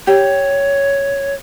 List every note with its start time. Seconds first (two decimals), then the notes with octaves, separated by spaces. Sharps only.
0.07 G4 C#5